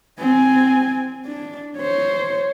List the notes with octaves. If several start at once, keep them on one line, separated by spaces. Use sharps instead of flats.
C4 G#5
D4
C5 C#5